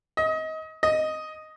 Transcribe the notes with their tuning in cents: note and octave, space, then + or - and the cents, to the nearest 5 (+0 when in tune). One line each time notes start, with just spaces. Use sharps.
D#5 +25
D#5 +0